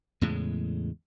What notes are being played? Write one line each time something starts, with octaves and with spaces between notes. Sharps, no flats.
E2 A2 C#3 G#3